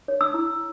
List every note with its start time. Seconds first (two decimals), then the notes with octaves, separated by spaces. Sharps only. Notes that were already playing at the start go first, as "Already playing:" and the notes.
0.08 C#5
0.21 E6
0.34 E4